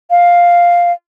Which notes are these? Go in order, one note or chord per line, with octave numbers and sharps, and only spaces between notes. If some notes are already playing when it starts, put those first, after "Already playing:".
F5